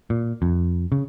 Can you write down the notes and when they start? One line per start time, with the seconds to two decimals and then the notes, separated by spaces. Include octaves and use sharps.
0.10 A#2
0.42 F2
0.92 C#3